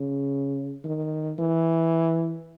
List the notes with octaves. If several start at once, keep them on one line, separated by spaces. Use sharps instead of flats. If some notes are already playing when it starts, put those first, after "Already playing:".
Already playing: C#3
D#3
E3